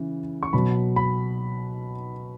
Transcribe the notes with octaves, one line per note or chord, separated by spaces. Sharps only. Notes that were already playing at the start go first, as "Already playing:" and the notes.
Already playing: C#3 E3
C#6
B2 F#3 B5
B5